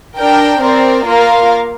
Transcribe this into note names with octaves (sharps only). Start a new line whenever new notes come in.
D4 A#4 G5
C4 A#4 D5
A#3 F4 A#4 F5